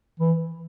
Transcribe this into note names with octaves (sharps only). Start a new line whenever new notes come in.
E3